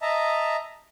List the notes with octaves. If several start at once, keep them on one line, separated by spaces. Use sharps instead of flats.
D#5 E5 A5 A#5